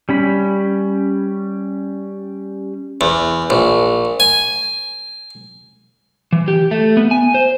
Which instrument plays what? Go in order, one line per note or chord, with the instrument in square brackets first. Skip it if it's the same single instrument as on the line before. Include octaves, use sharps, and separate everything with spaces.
[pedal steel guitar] G3 C#4 B5
[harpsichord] E2
A#1
G#5
[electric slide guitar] E3
G4
A3
B3
G#5
C5